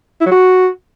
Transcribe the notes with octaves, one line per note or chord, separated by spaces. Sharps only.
E4
F#3
F#4